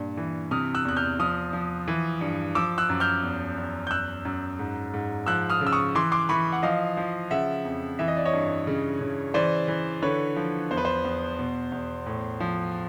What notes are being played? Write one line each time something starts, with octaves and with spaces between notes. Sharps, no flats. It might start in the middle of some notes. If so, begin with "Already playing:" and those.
Already playing: G2 A#2
E3
C3 D#6 F6
E6 F#6
E2 F#6
F6 G6
F3 D#6 F6
F3
E3
G2
F3 D6 E6
E6 F#6
F#2
F6 G6
E2
E2
G6
F#2 E6 F#6
F#2
G#2
G#2
F3 E6 F#6
D#6 F6
C#3
E6
C#6 D#6
E3 C6 D6
C6 D6
E3 B5 C#6
F#5
F3 D#5 F5
F3
C#3 E5 F#5
F2
E3 E5
D#5
D5
C#5 D#5
G2
C#3
C#3
E3 C5 D5
E3
D3 B4 C#5
F3
E2 C5
B4
C5
E2
B2
E2
A2
F3